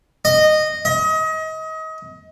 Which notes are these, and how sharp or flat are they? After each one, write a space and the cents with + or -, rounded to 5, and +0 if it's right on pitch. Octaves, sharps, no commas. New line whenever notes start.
D#5 -15
D#5 +30